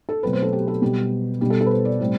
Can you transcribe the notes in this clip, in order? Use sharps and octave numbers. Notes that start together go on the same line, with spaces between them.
A4
B2 F#3 A3 C4 B4
C5
A4
G4
A4
B2 G3 B3 G4
B2 G3 B3 G4
A4
A4
B4
C5
D5
A2 G3 C4